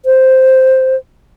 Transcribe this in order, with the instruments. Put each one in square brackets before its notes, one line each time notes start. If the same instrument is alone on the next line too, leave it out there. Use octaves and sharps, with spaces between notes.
[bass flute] C5